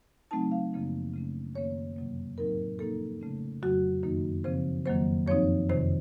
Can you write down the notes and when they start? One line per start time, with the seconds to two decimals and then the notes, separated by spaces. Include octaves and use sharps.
0.31 C#3 F#3 A3 C4 D#4 A5
0.51 F5
0.73 F#2 C#3 F3 A#3 D#4
1.14 C#3 A3 C#4
1.55 F#2 D#3 A#3 C#4 C#5
1.96 F2 C3 F#3 A#3
2.38 A2 F#3 C4 D#4 A#4
2.79 C3 F3 A#3 D#4 A4
3.21 C#3 A3 C#4
3.62 F2 C#3 F#3 F#4
4.03 F#2 D#3 A#3 D#4
4.44 C#3 F3 C4 C5
4.86 F2 D#3 F#3 A#3 C5
5.27 F#2 F3 C4 D#4 C#5
5.69 F2 C3 D#3 C5